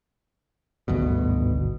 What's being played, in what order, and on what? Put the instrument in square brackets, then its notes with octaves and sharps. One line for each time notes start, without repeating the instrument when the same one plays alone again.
[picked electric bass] G#1 D2 G2 B2